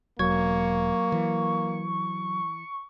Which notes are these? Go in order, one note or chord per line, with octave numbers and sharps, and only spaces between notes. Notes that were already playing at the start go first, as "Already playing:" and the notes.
E1 F#3 A#3 C#6 G#6
E3